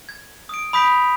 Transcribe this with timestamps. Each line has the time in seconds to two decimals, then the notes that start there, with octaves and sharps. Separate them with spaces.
0.09 G#6
0.49 D#6 D7
0.73 B5 D#6 G6 B6 D7 F7